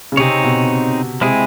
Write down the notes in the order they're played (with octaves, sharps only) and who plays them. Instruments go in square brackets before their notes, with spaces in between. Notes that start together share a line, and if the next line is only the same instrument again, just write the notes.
[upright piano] C#3
[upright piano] C3 [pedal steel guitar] C4 D#4 G#4 C#5
[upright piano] B2
[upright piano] C3 [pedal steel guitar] G#3 C4 E4 G#4